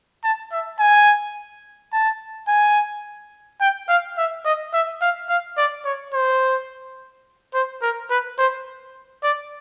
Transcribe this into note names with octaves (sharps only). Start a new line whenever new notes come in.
A5
E5
G#5
A5
G#5
G5
F5
E5
D#5
E5
F5
F5
D5
C#5
C5
C5
A#4
B4
C5
D5